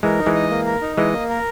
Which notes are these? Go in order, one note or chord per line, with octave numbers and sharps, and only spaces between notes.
E3 G#3 A#4
D#4
E3 G#3
D#5
A#3
A#4
D#4
E3 G#3 D#5
A#3
A#4